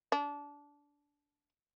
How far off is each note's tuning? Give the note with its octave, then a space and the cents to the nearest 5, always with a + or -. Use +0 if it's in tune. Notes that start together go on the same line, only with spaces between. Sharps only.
D4 -20